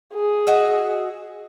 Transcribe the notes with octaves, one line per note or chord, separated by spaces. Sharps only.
G#4
F#4 D#5 E5